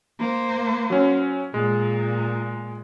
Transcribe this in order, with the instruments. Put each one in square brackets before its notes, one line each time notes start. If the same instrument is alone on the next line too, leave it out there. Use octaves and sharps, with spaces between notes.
[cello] A#3 C5
[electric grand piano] F#3 C#4
[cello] A#2 [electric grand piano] G#3